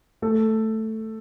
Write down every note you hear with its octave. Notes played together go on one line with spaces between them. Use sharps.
A3 A4